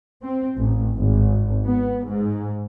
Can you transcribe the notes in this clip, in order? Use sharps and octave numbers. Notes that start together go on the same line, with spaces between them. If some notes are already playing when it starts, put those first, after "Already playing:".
C4
A1
G#1
B3
G#2